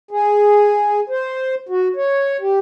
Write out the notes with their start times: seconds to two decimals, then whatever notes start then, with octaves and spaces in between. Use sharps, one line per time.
0.11 G#4
1.09 C5
1.69 F#4
1.96 C#5
2.41 G4